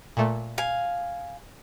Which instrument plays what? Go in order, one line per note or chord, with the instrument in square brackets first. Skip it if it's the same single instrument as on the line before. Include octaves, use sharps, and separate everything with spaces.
[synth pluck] A#2 A3
[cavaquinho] F5 G#5